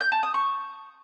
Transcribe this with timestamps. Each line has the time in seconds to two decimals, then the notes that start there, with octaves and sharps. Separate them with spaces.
0.01 G6
0.12 A5
0.23 D#6
0.34 C#6